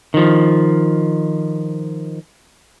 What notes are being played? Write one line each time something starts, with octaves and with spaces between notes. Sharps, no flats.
D#3 F3